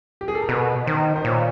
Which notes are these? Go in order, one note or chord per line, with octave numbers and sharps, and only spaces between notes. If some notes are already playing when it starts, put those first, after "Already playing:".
G4
G#4
A4
A#4
B2 B4
D#3 C5
C5
A#2 C#5